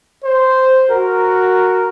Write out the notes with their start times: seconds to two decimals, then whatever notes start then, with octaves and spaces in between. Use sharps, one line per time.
0.25 C5
0.90 F#4 A#4